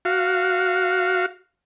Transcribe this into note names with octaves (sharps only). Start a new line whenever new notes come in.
F#4 F5